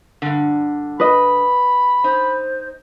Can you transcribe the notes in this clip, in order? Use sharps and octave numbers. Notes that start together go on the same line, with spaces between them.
G2 D3
B4 D#5 B5
D#4 C5